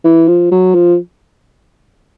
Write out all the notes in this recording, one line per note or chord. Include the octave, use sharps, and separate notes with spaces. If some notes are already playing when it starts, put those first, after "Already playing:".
E3
F3
F#3
F3